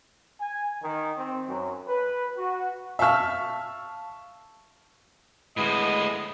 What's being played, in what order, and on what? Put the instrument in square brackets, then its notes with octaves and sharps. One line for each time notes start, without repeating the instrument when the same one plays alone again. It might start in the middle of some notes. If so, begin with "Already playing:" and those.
[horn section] G#5
D#3
C4
F#2
B4
F#4
[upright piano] E5 F5 A5 C#6 E6 F6
[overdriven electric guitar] D2 A2 [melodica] G#3 B3 E4 [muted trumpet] D#5